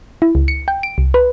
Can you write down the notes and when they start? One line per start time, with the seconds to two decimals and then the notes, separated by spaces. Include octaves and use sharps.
0.22 E4
0.35 C#2
0.48 C#7
0.68 G5
0.83 D7
0.98 C2
1.14 B4